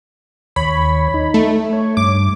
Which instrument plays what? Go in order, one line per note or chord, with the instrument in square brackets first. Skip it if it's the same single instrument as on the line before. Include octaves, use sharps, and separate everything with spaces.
[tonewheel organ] D#2 C#5 [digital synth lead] B5
[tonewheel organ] D#4
[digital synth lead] A3
[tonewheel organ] C#5
[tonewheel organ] G2 [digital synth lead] D6